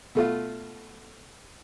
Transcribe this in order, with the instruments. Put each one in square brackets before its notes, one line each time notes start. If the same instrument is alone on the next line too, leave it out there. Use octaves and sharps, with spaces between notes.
[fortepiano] B2 A3 F4